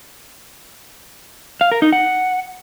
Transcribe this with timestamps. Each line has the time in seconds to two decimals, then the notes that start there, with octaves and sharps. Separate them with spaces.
1.61 F5
1.72 A#4
1.82 D#4
1.92 F#5